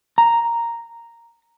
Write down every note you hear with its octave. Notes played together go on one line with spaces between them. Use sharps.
A#5